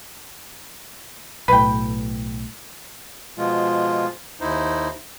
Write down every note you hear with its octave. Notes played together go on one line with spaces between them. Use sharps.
B1 A2 B4 G5
B2 F3 G#3 F4
D#2 D#4 E4 C5